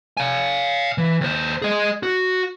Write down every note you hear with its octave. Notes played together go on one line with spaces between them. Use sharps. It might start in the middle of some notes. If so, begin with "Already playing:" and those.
F5 G#5
E3
D#2 C5
G#4 D#5
F#4